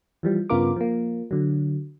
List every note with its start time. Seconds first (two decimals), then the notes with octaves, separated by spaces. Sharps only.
0.23 E3 F3 G3
0.50 G2 C#3 B3 F4 A#4 D6
0.76 F3 A#3
1.31 D3 F#3